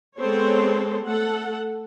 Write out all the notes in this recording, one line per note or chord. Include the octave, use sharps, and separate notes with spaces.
G#3 B3 C4 A4 C5 C#5
A3 A4 F#5